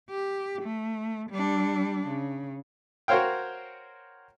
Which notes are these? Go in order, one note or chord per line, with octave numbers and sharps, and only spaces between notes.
G4
A3
G3 D4
C#3
F#4 A#4 C5 C#5 F5 G5